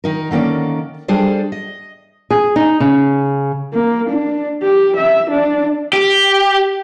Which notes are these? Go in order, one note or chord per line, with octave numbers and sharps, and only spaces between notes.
D#3 D#4 A#4
D3 D#3 A#3 C#4 D5
G3 D4 G#4 A4 C5 D5
D#5
G#4
D#4
C#3
A#3
D4
G4
E5
D4
G4